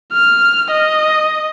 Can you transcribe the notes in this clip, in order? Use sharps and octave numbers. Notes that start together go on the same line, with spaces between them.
F6
D#5